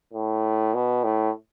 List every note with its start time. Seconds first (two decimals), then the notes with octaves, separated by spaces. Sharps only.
0.14 A2
0.74 B2
1.04 A2